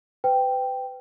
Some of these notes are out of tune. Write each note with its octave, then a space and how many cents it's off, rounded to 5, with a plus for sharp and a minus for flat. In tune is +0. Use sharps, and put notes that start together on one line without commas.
B4 +35 G5 +0